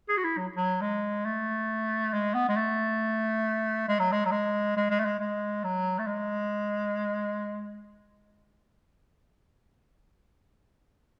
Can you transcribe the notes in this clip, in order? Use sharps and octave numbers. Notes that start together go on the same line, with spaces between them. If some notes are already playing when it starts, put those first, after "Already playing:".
G#4
F#4
E4
F#3
F#3
G#3
A3
G#3
B3
G#3
A3
G#3
F#3
G#3
F#3
G#3
G#3
G#3
A3
G#3
G#3
F#3
A3
G#3